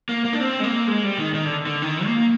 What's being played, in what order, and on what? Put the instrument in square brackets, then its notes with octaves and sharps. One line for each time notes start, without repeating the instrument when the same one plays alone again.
[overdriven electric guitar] A#3
A#3
D4
C4
G#3
A#3
G#3
G3
D#3
D#3
D3
D3
D#3
A#3